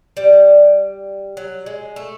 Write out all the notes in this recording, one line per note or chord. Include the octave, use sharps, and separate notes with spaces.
G3
F#3
G#3
A3